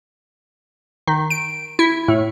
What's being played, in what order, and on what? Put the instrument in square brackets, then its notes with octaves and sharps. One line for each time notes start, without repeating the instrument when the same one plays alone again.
[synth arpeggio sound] D#3
D7
E4
A2